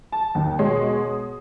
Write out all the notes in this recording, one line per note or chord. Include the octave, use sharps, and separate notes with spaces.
A5
D#2 D#3
B2 G#3 C#5 C6
D#6